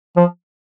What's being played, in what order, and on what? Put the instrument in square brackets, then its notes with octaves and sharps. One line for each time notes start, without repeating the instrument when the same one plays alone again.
[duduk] F3